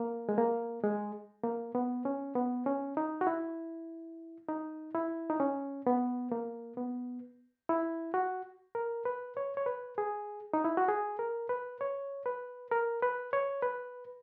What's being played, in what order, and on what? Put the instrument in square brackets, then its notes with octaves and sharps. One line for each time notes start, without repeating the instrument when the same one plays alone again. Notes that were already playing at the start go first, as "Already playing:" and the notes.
Already playing: [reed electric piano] A#3
G#3
A#3
G#3
A#3
B3
C#4
B3
C#4
D#4
F#4
E4
D#4
E4
D#4
C#4
B3
A#3
B3
E4
F#4
A#4
B4
C#5
C#5
B4
G#4
D#4
E4
F#4
G#4
A#4
B4
C#5
B4
A#4
B4
C#5
B4